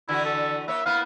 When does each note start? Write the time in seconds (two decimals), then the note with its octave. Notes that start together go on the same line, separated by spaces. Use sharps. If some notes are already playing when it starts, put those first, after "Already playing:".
0.09 D3 E3 E4 F#4
0.25 A4
0.68 A#3 C#5 E5
0.86 A#3 B3 E4 F5